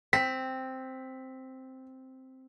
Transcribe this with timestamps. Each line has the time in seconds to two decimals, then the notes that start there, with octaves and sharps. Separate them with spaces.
0.13 C4 B6